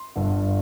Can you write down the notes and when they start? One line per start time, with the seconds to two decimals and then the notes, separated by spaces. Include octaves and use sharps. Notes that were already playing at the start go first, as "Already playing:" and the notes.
Already playing: C6
0.16 G1 G2 D3